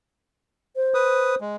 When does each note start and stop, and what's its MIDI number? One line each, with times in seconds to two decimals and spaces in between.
0.76 1.36 72
0.94 1.35 71
0.94 1.35 87
1.41 1.56 56